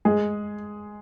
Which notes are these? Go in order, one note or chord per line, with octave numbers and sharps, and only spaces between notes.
G#3 G#4